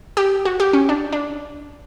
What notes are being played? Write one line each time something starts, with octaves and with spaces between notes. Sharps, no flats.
G4
F#4
G4
C#4
D4
D4